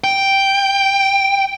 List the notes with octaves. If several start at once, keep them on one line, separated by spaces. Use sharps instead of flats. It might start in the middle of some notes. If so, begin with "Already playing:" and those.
G5